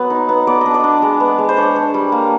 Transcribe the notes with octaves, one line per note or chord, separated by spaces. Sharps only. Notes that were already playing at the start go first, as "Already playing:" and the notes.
Already playing: F#3 B3
D#4
B3
B3 D5
D4 D#5
D5
D4
G#3
B3
G#3
C5
D4 C#5
D4
G3
A#3